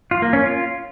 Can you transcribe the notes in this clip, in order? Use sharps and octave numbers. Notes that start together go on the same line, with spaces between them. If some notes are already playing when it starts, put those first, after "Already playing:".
F4
A#3
C#4
F4